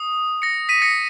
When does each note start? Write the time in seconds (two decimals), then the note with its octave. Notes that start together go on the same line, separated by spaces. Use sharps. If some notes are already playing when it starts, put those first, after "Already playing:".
Already playing: D#6
0.42 A#6 C#7
0.69 B6 D#7
0.82 A#6 C#7